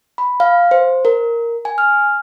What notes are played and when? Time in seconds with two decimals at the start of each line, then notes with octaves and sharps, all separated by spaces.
0.18 B5
0.40 F5
0.71 C5
1.05 A#4
1.65 G#5
1.78 F6